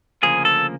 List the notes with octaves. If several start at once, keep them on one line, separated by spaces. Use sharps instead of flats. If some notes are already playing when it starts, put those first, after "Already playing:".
D2 C#3 F3 A#3 G#4
A4